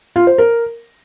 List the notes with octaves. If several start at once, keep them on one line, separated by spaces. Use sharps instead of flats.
F4
C5
A#4